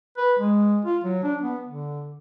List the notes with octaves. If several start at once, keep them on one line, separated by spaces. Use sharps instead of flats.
B4
G#3
F4
F#3
D4
B3
D3